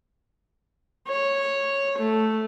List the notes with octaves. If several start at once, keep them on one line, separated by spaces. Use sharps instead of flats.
C#5
A3